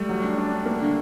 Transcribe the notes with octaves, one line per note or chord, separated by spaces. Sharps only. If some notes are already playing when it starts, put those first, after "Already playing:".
Already playing: G3 A3
F#3
D4
D4
D4
A#3
D3